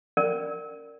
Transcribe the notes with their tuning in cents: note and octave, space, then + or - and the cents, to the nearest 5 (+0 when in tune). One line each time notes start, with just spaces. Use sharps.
C#4 +0 A#4 -20 D5 +0